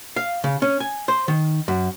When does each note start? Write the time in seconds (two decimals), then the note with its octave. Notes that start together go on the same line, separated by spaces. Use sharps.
0.16 F5
0.44 C#3
0.62 C#4
0.80 G#5
1.08 C5
1.28 D#3
1.68 F#2